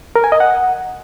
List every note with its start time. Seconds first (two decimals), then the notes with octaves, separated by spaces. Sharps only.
0.16 A#4
0.24 G#5
0.32 D#5
0.40 F#5